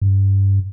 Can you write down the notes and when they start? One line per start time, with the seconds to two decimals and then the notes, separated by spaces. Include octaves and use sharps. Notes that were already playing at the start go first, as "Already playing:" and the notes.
0.02 G2